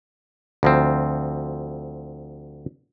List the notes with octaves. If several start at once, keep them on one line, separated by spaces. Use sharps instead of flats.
D2 F3 C4